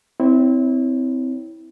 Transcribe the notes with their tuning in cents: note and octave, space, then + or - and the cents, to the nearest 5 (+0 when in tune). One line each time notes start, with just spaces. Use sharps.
C4 -15 E4 -20 C#5 +15